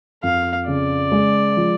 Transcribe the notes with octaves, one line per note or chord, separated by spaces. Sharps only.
F2 F5
C#3 D5
G#3
F3